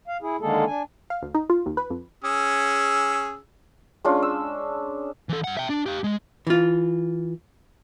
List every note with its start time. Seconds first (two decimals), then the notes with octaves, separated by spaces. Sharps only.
0.08 F5
0.22 E4 G#4
0.41 D3 D#3 G#3 A#3 G#4 A4
0.67 D4 G#5
1.10 F5
1.23 D2
1.34 D#4
1.50 F4
1.66 D#2
1.77 B4
1.90 F2
2.24 C#4 G#4 E6
4.04 G#3 C#4 D4 F4
4.22 E6
5.29 E3 A4
5.44 G2 F#5
5.57 E5 G5
5.70 D4
5.86 G4 F5
6.04 G#3
6.47 E3 F4